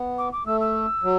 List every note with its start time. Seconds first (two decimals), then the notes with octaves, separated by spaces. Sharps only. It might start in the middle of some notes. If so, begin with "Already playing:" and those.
Already playing: B3
0.18 D6
0.32 D6
0.46 A3 E6
0.61 E6
1.04 F#3